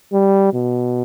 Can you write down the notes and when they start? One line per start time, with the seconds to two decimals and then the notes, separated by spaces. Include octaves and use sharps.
0.13 G3
0.53 B2